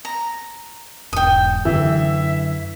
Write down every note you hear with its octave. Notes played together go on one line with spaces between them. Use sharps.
A#5
E1 G#2 G5 D#6
F#2 D3 E3 E5